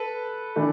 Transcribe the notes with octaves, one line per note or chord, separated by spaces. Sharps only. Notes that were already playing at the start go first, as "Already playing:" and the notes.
Already playing: A4 B4
E3 A3 D4